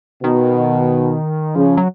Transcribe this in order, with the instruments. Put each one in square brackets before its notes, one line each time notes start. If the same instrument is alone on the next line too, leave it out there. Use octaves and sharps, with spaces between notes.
[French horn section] B2 [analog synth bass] D#3
[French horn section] C#3 [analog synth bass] F3
[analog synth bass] F#3